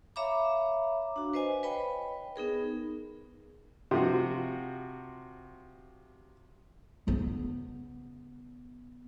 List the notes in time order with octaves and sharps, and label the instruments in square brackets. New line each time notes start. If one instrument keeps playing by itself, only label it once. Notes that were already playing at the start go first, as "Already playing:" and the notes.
[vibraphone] C#5 E5 F5 A#5 B5 D6
D4 F#4
B4 C5 D#5 F5 G#5
B4 C#5 D#5 G5 B5
B3 D#4 G#4 A#4
[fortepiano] C3 F3 F#4
[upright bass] C#3 B3